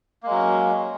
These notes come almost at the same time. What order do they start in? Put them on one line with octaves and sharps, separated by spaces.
A#3 G#3 F#3 C#4